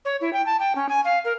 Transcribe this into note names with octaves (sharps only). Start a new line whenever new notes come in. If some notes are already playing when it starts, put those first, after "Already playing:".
C#5
E4
G5
A5
G5
C#4
G#5
F5
A#4